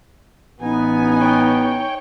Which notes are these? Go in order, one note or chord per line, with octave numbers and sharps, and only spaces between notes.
A1 B3 D#4 G#5
C#5 G5